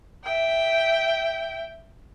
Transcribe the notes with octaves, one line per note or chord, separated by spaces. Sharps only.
E5 G5